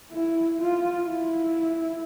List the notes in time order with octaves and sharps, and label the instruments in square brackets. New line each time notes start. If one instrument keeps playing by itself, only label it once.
[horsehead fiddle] E4
F4
E4